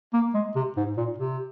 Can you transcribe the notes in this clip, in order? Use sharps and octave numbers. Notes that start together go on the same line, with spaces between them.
A#3
G#3
C3
G#2
A#2
C3